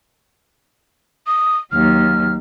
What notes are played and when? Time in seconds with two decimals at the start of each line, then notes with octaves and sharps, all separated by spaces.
1.27 D#6
1.72 D#2 F#3 F6